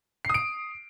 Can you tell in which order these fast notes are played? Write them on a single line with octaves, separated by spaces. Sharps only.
C7 D#6 D7